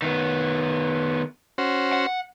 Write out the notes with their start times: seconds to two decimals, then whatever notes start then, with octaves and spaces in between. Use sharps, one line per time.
0.02 D#3 B3
1.58 C#4 F#4 C5
1.93 F#5